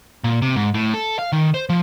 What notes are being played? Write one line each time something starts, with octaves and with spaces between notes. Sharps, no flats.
A#2
C3
G#2
A2
A4
F5
D#3
C5
F3